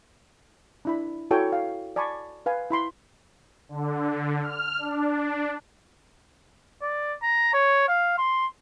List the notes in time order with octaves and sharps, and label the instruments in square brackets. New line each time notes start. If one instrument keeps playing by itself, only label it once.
[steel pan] D4 E4 B5
E4 F#4 A4 C#5 G5 G#5
F5
D5 G#5 A5 B5 C#6
B4 F5 G#5
E4 B5 C6
[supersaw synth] D3
F6
D4
[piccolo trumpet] D5
A#5
C#5
F5
C6